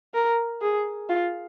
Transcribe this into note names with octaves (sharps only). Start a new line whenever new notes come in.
A#4
G#4
F4